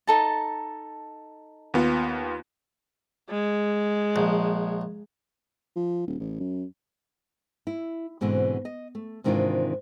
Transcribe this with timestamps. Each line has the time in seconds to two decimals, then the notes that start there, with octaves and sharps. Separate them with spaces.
0.07 D#4 A4 A5
1.74 D#2 B3 F4
3.30 G#3
4.16 A#1
5.76 F3
6.07 D#1
6.20 A1
6.39 F#2
7.67 E4
8.21 G#2 B2 D3 E3 C4
8.65 D#5
8.95 A3
9.24 G#2 C3 D#3 E3 D4 F4